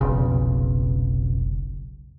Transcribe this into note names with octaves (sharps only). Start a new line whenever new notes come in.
F1 B1 C#3